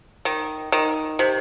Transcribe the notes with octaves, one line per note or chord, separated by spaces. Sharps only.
D#3
D#3
C3